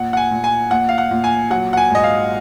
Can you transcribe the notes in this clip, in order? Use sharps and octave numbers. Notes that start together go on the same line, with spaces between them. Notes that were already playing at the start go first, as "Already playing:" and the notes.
Already playing: A#2 F#5
F#5
G#5
A#2
G#5
A#2 F#5
F5
F#5
A#2
G#5
F#3 F#5
F#5
G#5
G#2 D#5
F5